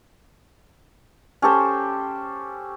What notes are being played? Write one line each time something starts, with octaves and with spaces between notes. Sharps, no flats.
C#4 G4 A4 C5